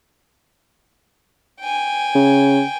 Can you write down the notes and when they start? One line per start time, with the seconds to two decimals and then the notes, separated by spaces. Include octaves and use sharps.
1.60 G5 G#5
2.15 C#3